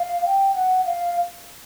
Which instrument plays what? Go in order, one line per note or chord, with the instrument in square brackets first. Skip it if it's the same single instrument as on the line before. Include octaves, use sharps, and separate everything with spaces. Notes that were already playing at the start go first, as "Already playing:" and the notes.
Already playing: [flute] F5
G5
F#5
F5